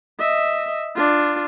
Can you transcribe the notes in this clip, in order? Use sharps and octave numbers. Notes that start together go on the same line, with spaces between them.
D#5 E5
D4 F4